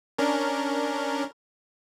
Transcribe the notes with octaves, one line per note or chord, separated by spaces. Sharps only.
C#4 D4 A#4